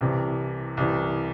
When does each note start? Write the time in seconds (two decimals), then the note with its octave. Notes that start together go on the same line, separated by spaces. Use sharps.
0.01 C2 C3 E3
0.77 C2 C3 E3